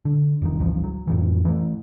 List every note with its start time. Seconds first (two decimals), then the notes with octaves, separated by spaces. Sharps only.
0.05 D3
0.42 F1 E2 G2 D#3
0.59 G#1 D2 E3 F3
0.84 F#3
1.07 F2 A2 E3
1.45 E3 F#3 A3